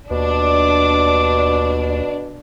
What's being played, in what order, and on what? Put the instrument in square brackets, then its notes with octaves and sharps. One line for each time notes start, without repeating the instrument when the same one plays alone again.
[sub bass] D#2 [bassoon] B2 [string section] D4 [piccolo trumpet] D6